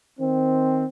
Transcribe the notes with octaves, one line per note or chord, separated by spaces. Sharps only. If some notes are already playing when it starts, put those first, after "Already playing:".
D#3 C4